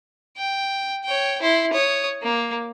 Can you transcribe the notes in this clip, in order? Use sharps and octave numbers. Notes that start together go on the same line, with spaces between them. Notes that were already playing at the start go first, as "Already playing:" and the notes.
G5
C#5 G5
E4 C6
C#5 D#6
A#3